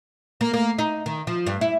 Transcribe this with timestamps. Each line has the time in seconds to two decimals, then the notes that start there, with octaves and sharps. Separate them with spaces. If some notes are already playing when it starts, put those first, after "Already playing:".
0.41 A#3
0.53 A#3
0.79 D#4
1.06 D#3
1.27 F3
1.47 G2
1.61 E4